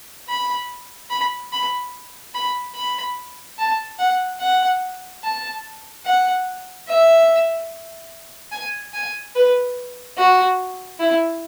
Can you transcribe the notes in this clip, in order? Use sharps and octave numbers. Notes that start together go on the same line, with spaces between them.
B5
B5
B5
B5
B5
A5
F#5
F#5
A5
F#5
E5
G#5
G#5
B4
F#4
E4